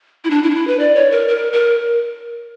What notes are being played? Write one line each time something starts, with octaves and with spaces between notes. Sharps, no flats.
E4
D4
E4
D4
E4
B4
D5
C#5
A#4
A#4
A#4